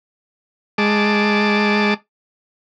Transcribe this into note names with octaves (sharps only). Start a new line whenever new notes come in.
G#3 A5 D6